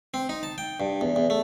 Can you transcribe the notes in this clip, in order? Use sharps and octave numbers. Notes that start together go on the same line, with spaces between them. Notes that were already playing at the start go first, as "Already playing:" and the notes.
C4
D#4
A5
G5
G2
E2
E2
A3